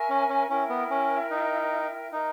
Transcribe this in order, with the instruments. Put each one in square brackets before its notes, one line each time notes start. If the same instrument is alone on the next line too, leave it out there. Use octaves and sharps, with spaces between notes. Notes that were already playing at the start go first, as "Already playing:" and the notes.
Already playing: [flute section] A#4 E5 G#5 C#6
[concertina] C#4
C#4
[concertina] C#4 [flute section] E4 A#4 E5 G5
[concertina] B3
C#4
D#4
[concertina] D#4 [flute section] A#4 E5 A#5